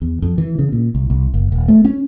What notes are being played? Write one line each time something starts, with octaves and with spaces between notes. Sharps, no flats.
E2
F2
E3
C#3
A#2
C2
C2
F#1
D#1
A3
C#4